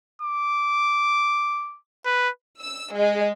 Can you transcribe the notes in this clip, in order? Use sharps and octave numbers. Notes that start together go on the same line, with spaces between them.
D6
B4
E6
G#3